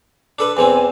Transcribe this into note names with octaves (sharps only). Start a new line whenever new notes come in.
D4 A4 B4
E2 E3 C4 G#5